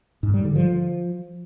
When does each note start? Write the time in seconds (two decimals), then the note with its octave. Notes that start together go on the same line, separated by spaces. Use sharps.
0.23 G#2
0.34 G3
0.45 D3
0.56 F3